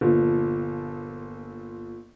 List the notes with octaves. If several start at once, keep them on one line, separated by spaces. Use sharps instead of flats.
G1 A#2 F3